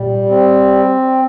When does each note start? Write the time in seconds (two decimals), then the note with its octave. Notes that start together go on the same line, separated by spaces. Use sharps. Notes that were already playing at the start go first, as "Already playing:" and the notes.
Already playing: A#2 G3
0.29 C4